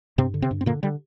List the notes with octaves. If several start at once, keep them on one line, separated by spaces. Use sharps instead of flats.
G2 C3 C4
D3
C3 C4
G2
C4
A#2 D3 A#3
D3 G3